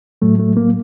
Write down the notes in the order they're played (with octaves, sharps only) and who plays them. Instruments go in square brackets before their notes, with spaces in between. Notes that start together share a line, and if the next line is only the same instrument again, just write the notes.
[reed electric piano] A2 F#3 A3
A3
A#3